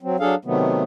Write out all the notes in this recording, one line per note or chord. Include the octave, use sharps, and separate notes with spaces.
F#3 C4
F#3 D4 G#4 A4 F5
C3 D#3 F#3 A3 B3